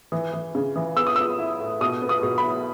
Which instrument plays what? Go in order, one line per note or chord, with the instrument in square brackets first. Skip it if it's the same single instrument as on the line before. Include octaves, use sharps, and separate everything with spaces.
[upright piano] E3
E3
C#3
E3
B3 E6
D#6
B3 E6
E4
A2
B2 D#6
B3
D#6
B2
B5
E4